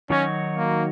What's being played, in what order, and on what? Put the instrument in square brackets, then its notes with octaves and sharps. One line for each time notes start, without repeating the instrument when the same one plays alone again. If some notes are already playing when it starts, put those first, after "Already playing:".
[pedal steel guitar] D#3 F#3 D#4 F#4 C#5 [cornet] C#4
[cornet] A#3